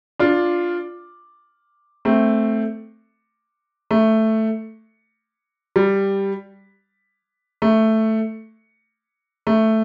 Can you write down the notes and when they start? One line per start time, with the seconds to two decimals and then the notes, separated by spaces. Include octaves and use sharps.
0.19 D4 F4
2.05 A3 C4
3.91 A3
5.76 G3
7.62 A3
9.47 A3